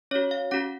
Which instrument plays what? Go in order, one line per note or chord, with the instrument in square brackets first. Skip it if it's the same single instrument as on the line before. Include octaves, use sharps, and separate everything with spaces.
[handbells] C#4 F#4 C#5
F5
C#4 F#4 F#5